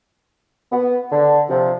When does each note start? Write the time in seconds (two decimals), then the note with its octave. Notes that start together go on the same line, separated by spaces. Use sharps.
0.72 B3
1.12 D3
1.49 C3 F3